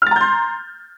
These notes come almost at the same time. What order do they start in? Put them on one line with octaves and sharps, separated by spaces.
F6 A6 A#5 G6 C6